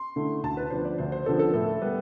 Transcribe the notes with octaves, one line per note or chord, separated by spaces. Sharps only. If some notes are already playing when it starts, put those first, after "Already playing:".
Already playing: C6
D3 A3 E4
D2 A5
B4
D3 F3 B3 D4 C5
D5
D2 C5
C5
D3 F3 B3 D4 A4
A4
A2 A4
G3 B3